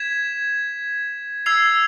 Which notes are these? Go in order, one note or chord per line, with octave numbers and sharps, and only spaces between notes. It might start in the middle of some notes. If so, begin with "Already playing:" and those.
Already playing: G#6 B6 E7
E6 G#6 C7 F7